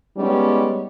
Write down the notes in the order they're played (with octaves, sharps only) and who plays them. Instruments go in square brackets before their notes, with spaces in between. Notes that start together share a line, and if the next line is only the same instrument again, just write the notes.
[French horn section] G3 G#3 B3 C#4 D#4 G4